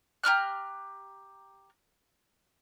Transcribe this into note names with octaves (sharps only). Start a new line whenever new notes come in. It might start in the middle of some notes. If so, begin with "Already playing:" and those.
G4 A#5 F6 F#6